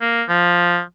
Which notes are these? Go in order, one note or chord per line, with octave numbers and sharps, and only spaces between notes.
A#3
F3